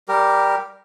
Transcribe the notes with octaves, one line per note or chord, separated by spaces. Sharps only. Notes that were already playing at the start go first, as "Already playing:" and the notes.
G3 G4 A#4